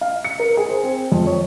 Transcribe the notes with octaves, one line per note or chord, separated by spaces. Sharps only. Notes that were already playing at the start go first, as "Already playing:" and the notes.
F5
C#7
A#4
G#4
C5
C4
F2
C#5